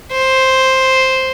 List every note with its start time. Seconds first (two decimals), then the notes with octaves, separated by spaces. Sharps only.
0.11 C5